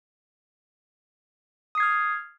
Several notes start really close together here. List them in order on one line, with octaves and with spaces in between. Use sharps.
D#6 C7 G#6 F6